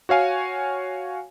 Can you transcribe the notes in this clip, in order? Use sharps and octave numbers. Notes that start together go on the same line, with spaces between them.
F#4 C#5 F5 G#5